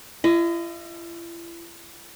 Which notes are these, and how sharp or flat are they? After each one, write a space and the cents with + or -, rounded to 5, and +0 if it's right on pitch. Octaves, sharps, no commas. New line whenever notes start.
E4 +45 D#5 +0